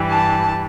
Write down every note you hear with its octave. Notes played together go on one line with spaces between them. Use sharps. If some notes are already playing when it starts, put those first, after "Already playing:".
Already playing: G2 E3 G3
A5